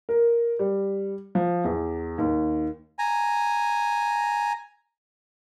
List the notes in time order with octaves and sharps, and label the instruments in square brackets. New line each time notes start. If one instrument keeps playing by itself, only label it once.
[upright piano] A#4
G3
F3
E2
D#2
[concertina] G#5 A#5